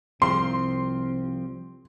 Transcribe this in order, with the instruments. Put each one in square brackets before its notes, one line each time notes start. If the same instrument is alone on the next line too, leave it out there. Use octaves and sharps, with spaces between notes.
[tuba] C2 [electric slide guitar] F3 C4 [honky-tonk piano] C6